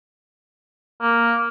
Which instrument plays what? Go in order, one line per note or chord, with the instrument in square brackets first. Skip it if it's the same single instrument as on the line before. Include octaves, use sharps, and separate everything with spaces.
[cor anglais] A#3